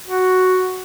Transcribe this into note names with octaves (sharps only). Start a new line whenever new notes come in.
F#4